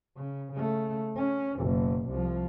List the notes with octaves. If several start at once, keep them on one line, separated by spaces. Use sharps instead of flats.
C#3
C#3 A3
C#4
F#1 B2
C2 F3